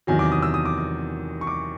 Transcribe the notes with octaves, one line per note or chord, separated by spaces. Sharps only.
E2 C3 D#3 F#3 G#5
D6
D#6
E6
D#6
D6
D#6
C#6
D6